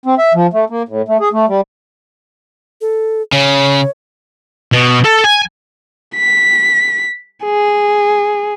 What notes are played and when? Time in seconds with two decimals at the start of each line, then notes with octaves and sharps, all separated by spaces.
0.06 C4
0.18 E5
0.34 F3
0.54 A3
0.70 A#3
0.89 A2
1.09 A3
1.20 G#4
1.33 A3
1.49 G3
2.81 A4
3.32 C#3 C#5
4.72 B2
5.04 A4
5.24 G#5
6.16 B6
7.45 G#4